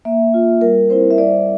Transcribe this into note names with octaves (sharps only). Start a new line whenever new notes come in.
A#3 E5
F4
G3 A#4
C4 E4 C5
E5
G3 D5